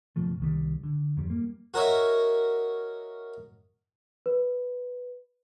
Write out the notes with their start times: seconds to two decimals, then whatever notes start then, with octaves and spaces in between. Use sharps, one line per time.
0.16 F#1 B2 F3 A3
0.40 C2 D#3 G3
0.83 D3
1.17 F2 G#2 G3
1.30 G3 A#3
1.74 F#4 A#4 C#5 D#5 E5
4.26 B4